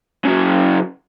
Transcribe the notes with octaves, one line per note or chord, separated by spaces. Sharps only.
C#3 F#3